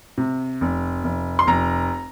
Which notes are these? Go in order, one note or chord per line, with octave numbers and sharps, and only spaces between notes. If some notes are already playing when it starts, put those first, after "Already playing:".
C3
F1
F1
C6
F1 A#5